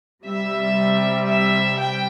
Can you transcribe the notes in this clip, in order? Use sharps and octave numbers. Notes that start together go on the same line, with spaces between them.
C3 G3 E5
E5
G5